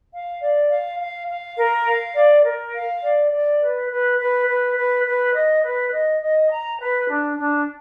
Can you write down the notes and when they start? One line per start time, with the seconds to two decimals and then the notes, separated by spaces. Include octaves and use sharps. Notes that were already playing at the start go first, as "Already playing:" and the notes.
0.12 F5
0.40 D5
0.69 F5
0.99 F5
1.28 F5
1.57 A#4
1.86 F5
2.15 D5
2.44 A#4
2.74 F5
3.02 D5
3.32 D5
3.61 B4
3.89 B4
4.18 B4
4.47 B4
4.76 B4
5.05 B4
5.35 D#5
5.63 B4
5.92 D#5
6.21 D#5
6.50 A#5
6.79 B4
7.08 D4
7.37 D4